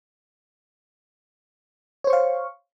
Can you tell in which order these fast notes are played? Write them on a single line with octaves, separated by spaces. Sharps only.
C#5 C5 C#6 F5